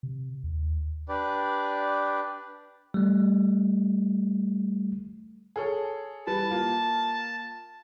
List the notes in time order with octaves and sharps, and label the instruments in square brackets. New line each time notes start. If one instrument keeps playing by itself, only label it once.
[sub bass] C3
D#2
[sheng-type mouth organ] D4 G4 B4 D5
[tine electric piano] G3 A3
[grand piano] G#4 A4 C#5
[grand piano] E3 G3 B4 [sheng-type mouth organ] A5
[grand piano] A#3 F4